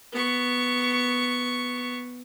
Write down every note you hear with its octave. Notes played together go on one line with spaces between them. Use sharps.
B3 C#6